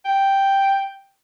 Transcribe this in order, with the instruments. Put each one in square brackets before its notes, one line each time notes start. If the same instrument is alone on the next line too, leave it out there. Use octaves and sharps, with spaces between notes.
[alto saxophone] G5